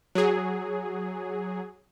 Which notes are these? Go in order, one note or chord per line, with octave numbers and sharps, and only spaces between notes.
F#3 G#4